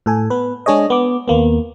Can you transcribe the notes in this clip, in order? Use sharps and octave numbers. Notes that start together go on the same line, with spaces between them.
A2 A4 G#5
B3 B4
G#3 D4 G#4 C#5 D#5
B3 D6
D#2 A#3 B3